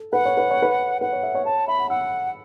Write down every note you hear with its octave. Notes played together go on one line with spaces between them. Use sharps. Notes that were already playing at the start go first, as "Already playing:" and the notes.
Already playing: A4
B4 F#5
C#5
B4
C#5
B4
B4 F#5
C#5
E5
C#5
C#5 A5
E5 B5
F#5
F#5 E6